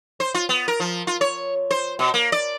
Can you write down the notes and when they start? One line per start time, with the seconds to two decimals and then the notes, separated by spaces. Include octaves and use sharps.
0.20 C5
0.34 F4
0.49 B3
0.68 A#4
0.80 F3
1.07 F4
1.21 C#5
1.71 C5
1.99 B2
2.14 A#3
2.32 D5